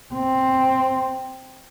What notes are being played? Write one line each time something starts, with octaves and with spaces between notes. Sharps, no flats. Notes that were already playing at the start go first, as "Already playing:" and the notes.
C4